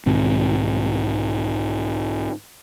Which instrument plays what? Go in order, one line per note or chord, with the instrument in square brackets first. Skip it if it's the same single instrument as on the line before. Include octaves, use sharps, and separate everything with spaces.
[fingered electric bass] B1 G#2 D#3 C4